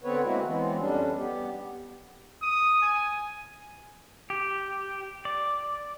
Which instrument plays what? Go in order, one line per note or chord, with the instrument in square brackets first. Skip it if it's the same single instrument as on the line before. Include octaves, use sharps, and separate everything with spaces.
[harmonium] D3 B3 C4 B4 C#5
G#3 A#3 C4 E4 F#4
E3 F#3 G#3 B3 C4
F2 G3 C#4 D4
B3 G4
[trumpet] D#6
G#5
[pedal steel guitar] G4
D5